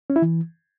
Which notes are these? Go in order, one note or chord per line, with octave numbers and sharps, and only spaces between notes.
C#4
E4
E3